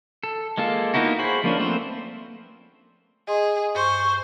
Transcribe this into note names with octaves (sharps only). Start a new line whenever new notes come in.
A4
G#3 A#3 F4 A4
A#3 B3 D#4 E4 F#4
F#4 G#4 C5 B5
F3 A#3 C#4 D4
A3 A#3 C4 B4 C5
G#4 D#5 C6
G2 C5 C6 C#6